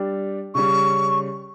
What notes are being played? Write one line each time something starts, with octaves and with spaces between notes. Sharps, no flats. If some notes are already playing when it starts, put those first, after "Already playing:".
Already playing: G3 D4 G4
C#3 G3 C#4 C#6